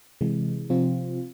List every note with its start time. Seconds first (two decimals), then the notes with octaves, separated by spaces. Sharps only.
0.21 C3 E3 G#3
0.70 C3 F3 C4 F4